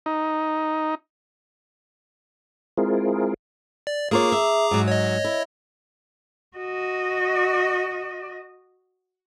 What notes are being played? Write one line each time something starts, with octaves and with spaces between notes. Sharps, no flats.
D#4
G#3 C4 E4 F4 G#4 A#4
D5
A#3 F4 G#4 C#5 A#5 D6
E5
G#2 F#3
C#5 D#5
E4
F#4 D#5